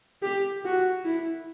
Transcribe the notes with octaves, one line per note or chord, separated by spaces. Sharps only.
G4
F#4
E4